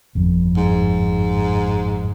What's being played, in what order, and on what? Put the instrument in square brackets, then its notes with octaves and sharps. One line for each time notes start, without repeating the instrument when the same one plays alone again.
[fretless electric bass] G1 F2
[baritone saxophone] G#2